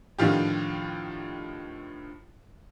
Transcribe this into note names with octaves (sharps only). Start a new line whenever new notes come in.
A2 D3 D#3 F3 F4 G4